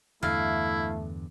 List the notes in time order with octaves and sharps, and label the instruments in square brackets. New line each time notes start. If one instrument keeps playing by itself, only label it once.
[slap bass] E2 G2 D3 [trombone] A3 [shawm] E4 [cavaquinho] F5